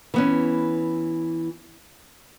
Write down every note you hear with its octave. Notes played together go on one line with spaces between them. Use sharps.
E3 B3 C#4